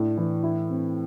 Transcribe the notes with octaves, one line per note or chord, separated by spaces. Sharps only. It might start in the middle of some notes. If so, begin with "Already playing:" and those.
Already playing: A2 D4
E3
E4
C4